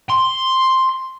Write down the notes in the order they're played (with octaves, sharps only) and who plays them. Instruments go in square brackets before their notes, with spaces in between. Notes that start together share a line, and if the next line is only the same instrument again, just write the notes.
[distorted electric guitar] C6